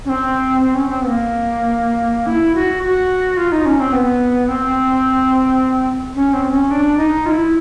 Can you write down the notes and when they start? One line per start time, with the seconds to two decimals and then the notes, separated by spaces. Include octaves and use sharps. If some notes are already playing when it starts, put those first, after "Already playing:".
0.05 C#4
0.09 C4
0.61 C4
0.74 C#4
0.88 C4
1.02 B3
1.07 A#3
2.27 E4
2.55 F#4
2.83 F#4
3.37 F4
3.52 D#4
3.65 C#4
3.80 C4
3.93 B3
4.48 C4
6.15 C#4
6.33 C4
6.51 C#4
6.71 D4
6.97 D#4
7.26 F4
7.31 E4